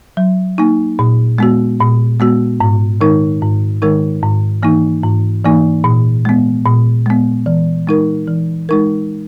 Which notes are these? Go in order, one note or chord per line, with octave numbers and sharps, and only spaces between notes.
F#3
A#3 D#4
A#2
G#3 B3 F#4
A#2
G#3 B3 F#4
G#2
D#3 G#3 D#4 A#4
G#2
D#3 G#3 D#4 A#4
G#2
E3 A#3 D#4
G#2
E3 A#3 D#4
A#2
G#3 B3
A#2
G#3 B3
E3
G#3 D#4 A#4
E3
G#3 D#4 A#4